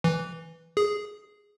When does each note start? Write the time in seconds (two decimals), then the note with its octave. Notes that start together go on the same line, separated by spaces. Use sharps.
0.04 E3
0.77 G#4